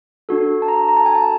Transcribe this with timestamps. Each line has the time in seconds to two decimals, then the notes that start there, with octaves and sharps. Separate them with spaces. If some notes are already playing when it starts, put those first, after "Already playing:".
0.29 D4 F#4 A4
0.62 A5
0.68 A#5
0.88 A#5
0.97 A5
1.06 G#5
1.15 A5